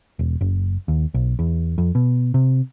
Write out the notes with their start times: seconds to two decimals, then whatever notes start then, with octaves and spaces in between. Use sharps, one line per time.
0.19 E1
0.41 F#1
0.88 D#2
1.14 B1
1.39 E2
1.78 F2
1.95 B2
2.34 C3